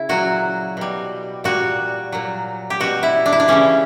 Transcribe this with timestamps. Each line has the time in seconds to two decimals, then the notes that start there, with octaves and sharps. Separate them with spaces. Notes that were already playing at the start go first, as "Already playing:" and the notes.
Already playing: C#3 E4
0.09 A#2 F#3 F#4
0.77 B2 G3
1.44 A#2 G3 F#4
2.12 A#2 F#3
2.70 G4
2.80 B2 G3 F#4
3.03 E4
3.26 D4
3.32 E4
3.40 D4
3.48 C#3 E3 G3 C#4